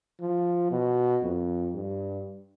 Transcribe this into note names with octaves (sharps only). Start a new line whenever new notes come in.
F3
B2
F2
G2